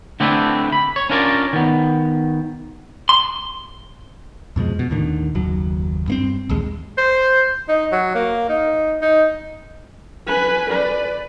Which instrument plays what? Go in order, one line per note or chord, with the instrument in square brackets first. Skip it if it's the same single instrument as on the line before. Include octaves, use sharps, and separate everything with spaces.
[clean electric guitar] D3 A3 C4 D4 E4 B4
B5
C#5
C#4 D4 F4 A#4 C#5 D5
D#3 B3
C6
[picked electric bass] F2 B2 F3 G#3
B2
D#2 A2 D3 D#3
F#1 D#2 F#3
G2 A#3 C4
A#1 D#2 G#3
[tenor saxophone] C5
D#4
F#3
A#3
D#4
D#4
[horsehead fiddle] B4 G#5
B4 D5